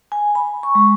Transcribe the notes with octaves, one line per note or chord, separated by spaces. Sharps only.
G#5
B5
C#6
G#3